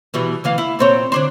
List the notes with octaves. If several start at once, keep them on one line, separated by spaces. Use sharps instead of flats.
B2 E3 G3
D2 E3 F5
E4
A#2 C4 C#5
D3 D4 C5